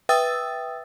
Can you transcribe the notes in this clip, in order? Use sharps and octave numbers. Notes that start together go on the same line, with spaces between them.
B4 E5 G5 D#6 E6 A6